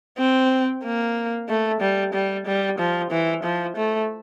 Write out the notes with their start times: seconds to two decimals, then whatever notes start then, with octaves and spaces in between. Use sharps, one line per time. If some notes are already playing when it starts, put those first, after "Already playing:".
0.18 C4
0.84 A#3
1.49 A3
1.81 G3
2.14 G3
2.46 G3
2.79 F3
3.11 E3
3.43 F3
3.76 A3